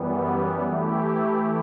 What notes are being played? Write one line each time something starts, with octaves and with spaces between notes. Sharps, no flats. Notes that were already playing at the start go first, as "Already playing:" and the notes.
Already playing: F#2 E3 G3 B3
E3 A3 E4 G4